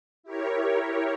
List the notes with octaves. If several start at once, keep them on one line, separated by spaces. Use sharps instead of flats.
E4 G4 A#4 C#5